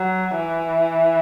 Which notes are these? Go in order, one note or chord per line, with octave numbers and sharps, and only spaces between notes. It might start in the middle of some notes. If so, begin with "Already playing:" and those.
Already playing: F#3
E3